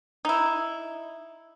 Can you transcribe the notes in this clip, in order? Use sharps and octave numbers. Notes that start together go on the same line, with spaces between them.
D#4 E4